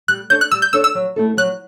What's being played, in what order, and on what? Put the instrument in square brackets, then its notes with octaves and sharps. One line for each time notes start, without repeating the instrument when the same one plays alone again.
[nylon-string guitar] G3 [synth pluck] F#6
[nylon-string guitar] D4 A4 C#5 [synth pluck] G6
[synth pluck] F#6
[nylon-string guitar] G3 [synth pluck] E6
[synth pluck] G6
[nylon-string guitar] D4 A4 C#5 [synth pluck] E6
[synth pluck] E6
[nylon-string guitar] F#3
A3 E4 A4
[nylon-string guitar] F#3 [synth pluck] F#6